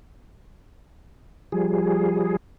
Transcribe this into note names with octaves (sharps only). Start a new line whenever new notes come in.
F3 G3 G#4